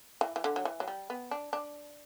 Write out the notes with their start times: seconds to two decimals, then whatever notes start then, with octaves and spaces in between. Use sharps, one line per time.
0.21 E3
0.36 E3
0.44 D3
0.56 F#3
0.65 E3
0.80 F#3
0.88 G3
1.10 B3
1.31 D4
1.53 D4